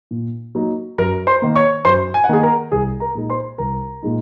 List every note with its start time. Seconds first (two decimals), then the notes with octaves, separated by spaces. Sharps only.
0.11 A#2
0.55 F#3 A#3 D#4
0.98 F#2 A#4 A#5
1.27 C5 C6
1.42 D#3 A#3
1.56 C#5 C#6
1.85 F#2 C5 C6
2.14 G#5
2.24 F#5
2.29 D#3 A#3 G#4 G#5
2.43 A#4 A#5
2.72 C2 G#4 G#5
3.00 A#4 A#5
3.15 A#2 G#3 D#4
3.30 C5 C6
3.58 C2 A#4 A#5
4.03 A#2 G#3 D#4